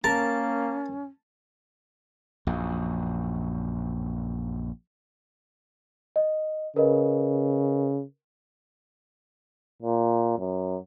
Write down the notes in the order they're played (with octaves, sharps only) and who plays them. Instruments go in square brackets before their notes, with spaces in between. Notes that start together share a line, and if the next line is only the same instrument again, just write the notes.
[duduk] A#3 [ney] C#4 [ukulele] A#4 [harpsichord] A5
[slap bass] A#1 F#2
[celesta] D#5
[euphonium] C#3 [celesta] A#4 B4 D#5
[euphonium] A#2
F#2